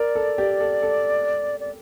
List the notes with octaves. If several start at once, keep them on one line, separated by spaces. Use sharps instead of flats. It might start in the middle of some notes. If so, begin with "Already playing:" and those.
Already playing: A#4 D5
A4
G4
A4
A4
D5